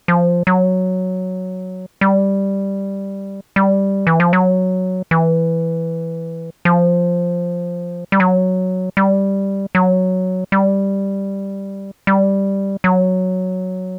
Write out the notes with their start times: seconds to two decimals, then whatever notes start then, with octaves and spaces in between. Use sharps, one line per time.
0.08 F3
0.47 F#3
2.01 G3
3.56 G3
4.07 E3
4.20 F3
4.33 F#3
5.11 E3
6.65 F3
8.12 G3
8.20 F#3
8.97 G3
9.75 F#3
10.52 G3
12.07 G3
12.84 F#3